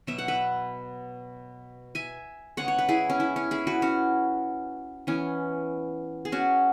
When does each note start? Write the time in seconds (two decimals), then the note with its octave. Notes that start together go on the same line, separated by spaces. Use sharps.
0.07 B2 F#3 B3 E5
0.18 F#5
0.28 B4 E5
1.95 E5 G#5
2.57 C#3 G#3 B3 C#5 F#5
2.68 C#5
2.78 B4
2.89 E4 G#4
3.10 C#4
3.20 E4
3.36 C#4
3.51 E4 G#4
3.67 F#4 B4
3.82 C#4 F#4
5.07 E3 B3 C#4
6.25 G#4
6.32 C#4 F#4